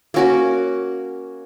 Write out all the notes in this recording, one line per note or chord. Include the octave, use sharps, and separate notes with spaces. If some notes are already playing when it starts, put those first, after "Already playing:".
A#3 C#4 F#4 A#4